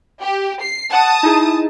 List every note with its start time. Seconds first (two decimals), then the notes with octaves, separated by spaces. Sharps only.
0.23 G4
0.62 C7
0.92 F#5 A5 D#6
1.23 D#4 E4 G#4